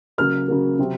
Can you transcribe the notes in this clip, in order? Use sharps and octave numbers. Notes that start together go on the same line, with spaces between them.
C#3 F#3 A#3 F6
C#3 F#3 A#3
C3 F#3 C4